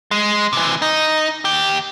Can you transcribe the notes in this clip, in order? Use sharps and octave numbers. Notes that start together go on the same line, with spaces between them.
G#3
C3 E3
D#4
D#2 G4